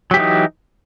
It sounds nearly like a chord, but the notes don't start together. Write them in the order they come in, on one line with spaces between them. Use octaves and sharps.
F#3 G4 E3 D#4